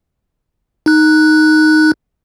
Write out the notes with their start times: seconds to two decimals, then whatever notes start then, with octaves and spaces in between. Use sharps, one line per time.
0.86 D#4 F#6